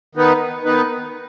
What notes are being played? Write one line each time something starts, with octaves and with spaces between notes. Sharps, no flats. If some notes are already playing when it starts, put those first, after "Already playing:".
D#3 B3 D#4 B4
D#3 B3 D#4 B4